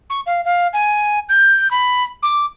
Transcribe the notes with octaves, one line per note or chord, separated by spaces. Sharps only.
C#6
F5
F5
G#5
G6
B5
D6